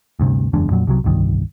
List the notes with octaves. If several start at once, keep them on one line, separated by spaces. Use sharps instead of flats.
D2 G2 C3
F#1 E2 G#3 D4
F2 A#2 F#3
C2 C3 F#3
D1 C2 G2 D#3